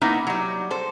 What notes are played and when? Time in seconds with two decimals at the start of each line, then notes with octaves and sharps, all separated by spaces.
0.01 A#3 B3 D#4 E4
0.27 F#3 G3
0.71 A4 C5